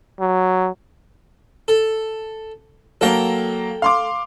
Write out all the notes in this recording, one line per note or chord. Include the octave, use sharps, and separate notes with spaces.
F#3
A4
F#3 A#3 A4 G5 A#5
F5 C6 D6